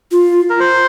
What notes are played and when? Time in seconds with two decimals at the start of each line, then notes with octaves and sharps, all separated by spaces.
0.12 F4
0.50 A#4
0.60 C5